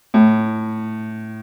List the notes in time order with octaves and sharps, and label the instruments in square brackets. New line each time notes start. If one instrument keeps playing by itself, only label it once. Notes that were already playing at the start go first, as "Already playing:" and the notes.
[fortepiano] A2